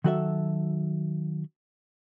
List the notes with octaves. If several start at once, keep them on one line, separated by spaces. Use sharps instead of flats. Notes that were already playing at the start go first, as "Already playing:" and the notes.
D#3 F#3 F#4 A4 D#5 E5